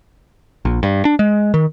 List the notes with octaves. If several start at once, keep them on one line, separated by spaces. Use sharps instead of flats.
A#1
G2
D4
G#3
D#3